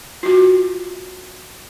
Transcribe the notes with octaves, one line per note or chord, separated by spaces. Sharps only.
F4 F#4